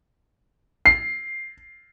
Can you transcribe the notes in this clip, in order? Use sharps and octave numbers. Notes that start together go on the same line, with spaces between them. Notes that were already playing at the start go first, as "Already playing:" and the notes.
C7